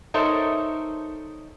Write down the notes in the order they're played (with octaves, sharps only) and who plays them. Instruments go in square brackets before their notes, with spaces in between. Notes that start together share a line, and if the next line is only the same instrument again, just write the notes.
[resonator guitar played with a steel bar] D#4 A4 A#4 C5 C#5 E5